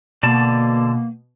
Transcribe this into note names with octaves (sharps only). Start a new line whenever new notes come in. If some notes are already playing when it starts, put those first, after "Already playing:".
B2 D3 A#3 D5 A5